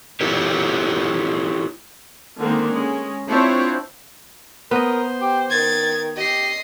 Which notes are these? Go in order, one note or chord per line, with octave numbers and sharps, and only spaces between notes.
E4 F#4 G4 A4 C#5
D3 D#3 G#3 A#3 C4
G#3 C#4
C4 D4 E4 F4 C5 C#5
B3 A#4 C5 D#5
G4
D#3 G#6 A6
G4 D#5 C7